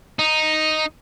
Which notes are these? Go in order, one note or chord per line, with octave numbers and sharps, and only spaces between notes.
D#4